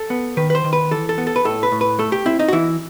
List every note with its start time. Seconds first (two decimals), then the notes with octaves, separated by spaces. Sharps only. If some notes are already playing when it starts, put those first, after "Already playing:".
Already playing: A4
0.10 B3
0.37 D#3 B4
0.50 B4
0.55 C5
0.64 D#3
0.73 B4
0.91 E3 A4
1.09 A4
1.18 B3
1.27 A4
1.36 B4
1.45 A2 A4
1.63 B4
1.72 A2
1.81 B4
1.99 A3 A4
2.12 G4
2.26 C4 E4
2.39 D#4
2.48 F#4
2.53 E3 E4